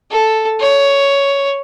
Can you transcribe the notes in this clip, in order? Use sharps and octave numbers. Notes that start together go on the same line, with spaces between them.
A4
C#5